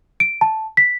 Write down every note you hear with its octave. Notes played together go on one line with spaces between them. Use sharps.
D7
A5
B6